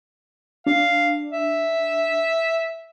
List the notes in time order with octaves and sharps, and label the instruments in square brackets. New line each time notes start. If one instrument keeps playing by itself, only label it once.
[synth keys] D4 [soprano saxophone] F5
[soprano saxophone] E5